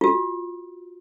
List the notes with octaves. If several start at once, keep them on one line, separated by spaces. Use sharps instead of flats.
F4 F#4